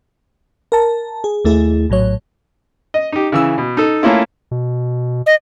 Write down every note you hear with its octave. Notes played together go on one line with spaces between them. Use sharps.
A#4 A5
G#4
D#2 A3 E4 G#4
A#1 A2 F#3 C#5
D#5
D#4 G4
C#3 E3 E6
B2
D#4 A4
A3 A#3 C#4 E4 F4
B2
D#5